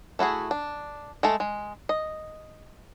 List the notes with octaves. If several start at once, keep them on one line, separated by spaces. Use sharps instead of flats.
A3 E4 F#4 G#4
D4
G#3 A3 A4
G#3
D#5